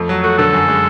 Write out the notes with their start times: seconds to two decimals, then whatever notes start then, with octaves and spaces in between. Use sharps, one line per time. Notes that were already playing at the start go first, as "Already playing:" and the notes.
Already playing: F2 A3
0.09 F#3
0.23 A3 F#4
0.38 D3 A4
0.53 F#2
0.68 G#3